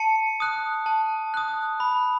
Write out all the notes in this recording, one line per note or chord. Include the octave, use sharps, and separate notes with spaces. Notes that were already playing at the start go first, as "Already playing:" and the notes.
Already playing: A5 C#7
D#6 F#6
A5
D#6 F#6
B5